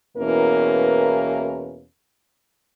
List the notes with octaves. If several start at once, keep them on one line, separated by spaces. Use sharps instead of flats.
E2 B2 E3 A#3 C#4 A#4